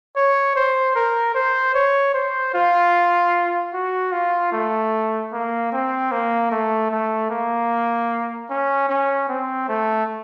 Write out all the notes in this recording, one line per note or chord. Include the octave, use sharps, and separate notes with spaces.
C#5
C5
A#4
C5
C#5
C5
F4
F#4
F4
A3
A#3
C4
A#3
A3
A3
A#3
C#4
C#4
C4
A3